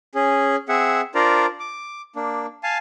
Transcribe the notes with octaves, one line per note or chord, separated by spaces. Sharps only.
C#4 G#4
C4 G#4 E5 F#5
D4 F4 A#4 C5 D5 A#5
D6
A#3 D4
F5 G#5 A5